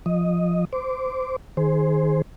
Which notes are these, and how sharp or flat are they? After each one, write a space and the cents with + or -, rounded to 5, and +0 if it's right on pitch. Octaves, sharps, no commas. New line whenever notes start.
F3 +0 D#5 +0
C5 -20 D6 -15
D#3 +0 G#4 +10 C5 +0